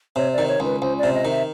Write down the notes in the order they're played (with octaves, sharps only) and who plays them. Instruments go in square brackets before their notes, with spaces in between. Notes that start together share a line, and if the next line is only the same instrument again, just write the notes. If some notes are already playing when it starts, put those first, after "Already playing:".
[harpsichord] C3 [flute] C#5
[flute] D5
[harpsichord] D#3
[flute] C#5
[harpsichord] C#2
[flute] B4
[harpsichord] C#2 [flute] C5
[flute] D5
[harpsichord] C3
[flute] D#5
[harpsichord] D#3
[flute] E5